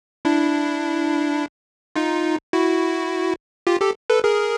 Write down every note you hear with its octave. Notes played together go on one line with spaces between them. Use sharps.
D4 E4
D#4 F4
E4 F#4
F4 G4
G4 A4
A4 B4
G#4 A#4